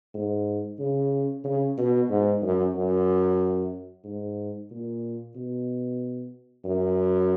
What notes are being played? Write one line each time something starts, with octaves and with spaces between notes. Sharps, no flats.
G#2
C#3
C#3
B2
G#2
F#2
F#2
G#2
A#2
B2
F#2